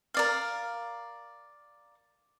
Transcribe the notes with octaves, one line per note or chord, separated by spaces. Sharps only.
A#4 D5 F5